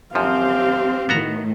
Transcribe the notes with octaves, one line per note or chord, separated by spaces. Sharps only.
F#2 F3 C4 G4 F5
A2 D#3 B3 F#4 A#5